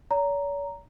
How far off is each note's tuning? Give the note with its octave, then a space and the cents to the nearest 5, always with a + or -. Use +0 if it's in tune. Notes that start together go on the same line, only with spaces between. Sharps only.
C#5 +45 A#5 +0